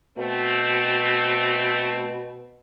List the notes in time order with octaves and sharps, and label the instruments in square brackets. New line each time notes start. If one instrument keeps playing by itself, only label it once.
[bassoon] B2 [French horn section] A3 C4